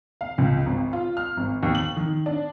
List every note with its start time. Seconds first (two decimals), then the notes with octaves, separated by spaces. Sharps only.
0.21 F5
0.38 C#2
0.66 G#1
0.93 F4
1.17 F6
1.37 G#1
1.63 D#2
1.75 F#7
1.97 D#3
2.26 D4